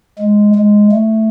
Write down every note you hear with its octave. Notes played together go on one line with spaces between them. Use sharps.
G#3
G#3
A3